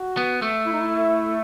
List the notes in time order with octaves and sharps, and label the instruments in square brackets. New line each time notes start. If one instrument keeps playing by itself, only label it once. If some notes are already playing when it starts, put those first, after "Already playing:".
Already playing: [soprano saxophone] F#4
[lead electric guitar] B3
A3
[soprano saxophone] E4
D#4
E4